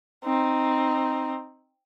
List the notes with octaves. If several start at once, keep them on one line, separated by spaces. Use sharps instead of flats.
C4 D#4